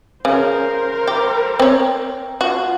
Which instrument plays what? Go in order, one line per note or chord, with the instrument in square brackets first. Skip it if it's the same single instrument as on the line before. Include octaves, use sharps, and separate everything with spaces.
[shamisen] C#3 [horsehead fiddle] A#4 C5
[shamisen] G4
C4 C#5
[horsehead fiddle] F4 [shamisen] F#4